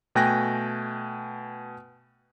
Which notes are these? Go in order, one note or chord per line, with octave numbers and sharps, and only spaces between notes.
B2 A3 G5 G#5 F#6 A#6